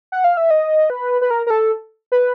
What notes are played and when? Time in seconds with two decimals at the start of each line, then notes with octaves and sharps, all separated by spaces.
0.12 F#5
0.24 F5
0.37 E5
0.51 D#5
0.90 B4
1.21 B4
1.30 A#4
1.47 A#4
1.50 A4
2.12 B4